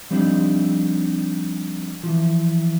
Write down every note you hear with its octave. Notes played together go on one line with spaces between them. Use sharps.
F3 G3 C4 D4 D#4
E3 F3